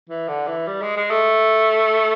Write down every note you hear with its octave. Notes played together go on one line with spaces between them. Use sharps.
E3
D3
E3
G3
G#3
G#3
A3